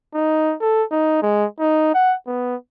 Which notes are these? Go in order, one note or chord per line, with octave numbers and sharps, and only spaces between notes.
D#4
A4
D#4
G#3
D#4
F#5
B3